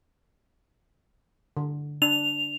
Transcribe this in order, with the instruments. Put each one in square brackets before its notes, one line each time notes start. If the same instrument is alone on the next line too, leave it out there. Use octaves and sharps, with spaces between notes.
[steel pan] D3
[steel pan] D4 [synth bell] F7